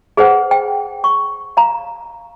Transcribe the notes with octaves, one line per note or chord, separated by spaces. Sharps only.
G#4 B4 C5 F#5
G5
C#6
F5 A#5